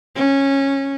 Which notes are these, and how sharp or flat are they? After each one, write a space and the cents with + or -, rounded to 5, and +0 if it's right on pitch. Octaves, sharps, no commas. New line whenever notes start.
C#4 -15